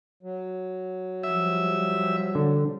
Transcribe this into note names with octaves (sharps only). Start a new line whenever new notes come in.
F#3
F3 G3 E5
D3